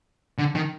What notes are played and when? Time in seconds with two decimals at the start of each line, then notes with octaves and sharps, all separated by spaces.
0.38 D3
0.55 D#3